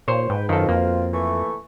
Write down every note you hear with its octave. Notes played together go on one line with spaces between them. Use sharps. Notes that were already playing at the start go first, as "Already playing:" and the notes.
D#2 A#2 C5 C#5
G#2 B4 G5
F#2 B2 D#3 C4 F4 A4
F2 A#3
E3 A3 C#6